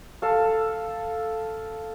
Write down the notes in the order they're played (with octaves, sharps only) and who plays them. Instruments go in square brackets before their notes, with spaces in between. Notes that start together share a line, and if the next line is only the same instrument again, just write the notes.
[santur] A4 F5